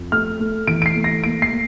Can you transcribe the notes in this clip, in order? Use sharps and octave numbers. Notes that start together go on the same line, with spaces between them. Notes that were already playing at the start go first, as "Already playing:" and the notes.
Already playing: F2
A3 F6
A3
E3 D7
D7
C7
A3
A#6
A#3 D7
C7
A#3